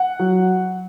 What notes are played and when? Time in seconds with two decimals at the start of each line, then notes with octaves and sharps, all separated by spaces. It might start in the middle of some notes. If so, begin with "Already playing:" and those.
Already playing: F#5
0.19 F#3